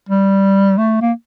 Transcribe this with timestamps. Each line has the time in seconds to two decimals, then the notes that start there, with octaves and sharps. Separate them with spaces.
0.09 G3
0.78 A3
1.02 A#3